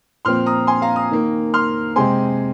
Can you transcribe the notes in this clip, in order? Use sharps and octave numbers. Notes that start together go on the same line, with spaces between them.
A#2 F3 C4 C6 F6
A#5 D#6
G#5 C6
F5 A#5
A#5 D#6
D#3 A#3
C6 F6
C3 G#3 C4 G#5 C6